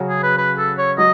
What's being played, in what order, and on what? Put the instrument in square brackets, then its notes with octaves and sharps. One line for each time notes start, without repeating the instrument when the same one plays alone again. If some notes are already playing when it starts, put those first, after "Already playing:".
Already playing: [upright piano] C#3 F#3 C#4 F#4
[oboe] G#4
B4
B4
A4
C#5
[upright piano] F#3 [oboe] D#5